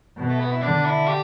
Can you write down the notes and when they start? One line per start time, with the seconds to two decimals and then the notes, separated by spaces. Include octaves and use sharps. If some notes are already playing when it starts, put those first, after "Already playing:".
0.17 B2
0.28 A3
0.40 B3
0.51 E4
0.62 D3 D4
0.85 E4
1.07 G4